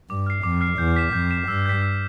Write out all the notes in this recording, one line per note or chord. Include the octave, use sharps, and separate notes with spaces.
G2 D6
F6 C7
F2 D6
F6 C7
E2 G6
B6 E7
F2 G6
B6 E7
G2 E6
G6 B6
E6